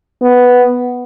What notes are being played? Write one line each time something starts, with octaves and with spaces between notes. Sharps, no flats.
B3